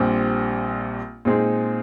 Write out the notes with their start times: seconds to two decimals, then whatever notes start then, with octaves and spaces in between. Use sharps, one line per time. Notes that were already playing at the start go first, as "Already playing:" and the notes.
Already playing: A#1 A#2 G3 C4 G4
1.25 A#2 G#3 C4 D#4 G#4